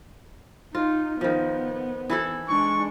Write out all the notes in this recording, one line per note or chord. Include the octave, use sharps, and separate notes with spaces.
D#4 F4
D#3 F3 B3
E3 E4 A4
G#3 D4 C#6